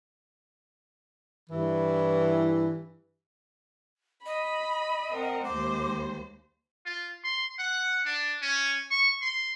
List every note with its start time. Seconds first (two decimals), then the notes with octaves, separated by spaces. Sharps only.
1.50 G2 E3
4.26 D#5 B5
5.11 C4 A#4 F#5
5.44 D#2 G#3 C5 D6
6.86 F4
7.24 C6
7.58 F#5
8.05 D4
8.42 C#4
8.91 C#6
9.22 C6